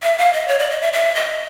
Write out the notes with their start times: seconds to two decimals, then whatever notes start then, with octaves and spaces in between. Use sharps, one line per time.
0.03 E5
0.18 F5
0.33 D#5
0.48 C#5
0.59 D5
0.70 D#5
0.81 E5
0.93 E5
1.15 D#5